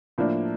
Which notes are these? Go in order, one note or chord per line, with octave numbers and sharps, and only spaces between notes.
A2 F3 A#3 D4